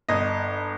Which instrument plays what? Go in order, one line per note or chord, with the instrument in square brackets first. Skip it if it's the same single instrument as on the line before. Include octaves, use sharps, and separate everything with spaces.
[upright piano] G1 [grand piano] D#5